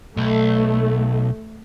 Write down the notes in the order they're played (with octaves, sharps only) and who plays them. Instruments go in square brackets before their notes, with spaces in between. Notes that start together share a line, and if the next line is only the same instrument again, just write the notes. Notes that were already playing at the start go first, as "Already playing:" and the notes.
[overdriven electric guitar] B1 [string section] A3